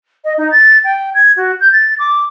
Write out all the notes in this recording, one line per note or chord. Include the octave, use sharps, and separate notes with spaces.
D#5
D#4
A6
G5
G#6
F#4
G6
A6
D6